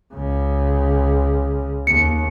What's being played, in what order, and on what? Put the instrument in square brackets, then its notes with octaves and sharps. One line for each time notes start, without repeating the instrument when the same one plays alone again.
[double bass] C#2 C#3
[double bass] D#2 [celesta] C#7